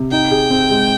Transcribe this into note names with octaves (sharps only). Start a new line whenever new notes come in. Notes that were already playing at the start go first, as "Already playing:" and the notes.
Already playing: C3
D#4 G5
G#4
C4
G#3